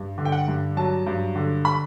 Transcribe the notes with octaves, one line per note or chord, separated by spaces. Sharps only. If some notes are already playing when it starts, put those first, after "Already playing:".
Already playing: G2
D3
G5
F#5
G2
F#3 A5
G2
D3
B5